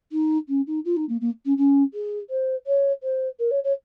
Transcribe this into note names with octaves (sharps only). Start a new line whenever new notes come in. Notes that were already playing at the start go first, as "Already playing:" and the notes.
D#4
C#4
D#4
F4
D#4
A#3
A#3
C#4
C#4
G#4
C5
C#5
C5
A#4
C#5
C#5